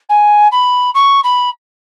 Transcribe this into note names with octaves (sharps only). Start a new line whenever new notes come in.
G#5
B5
C#6
B5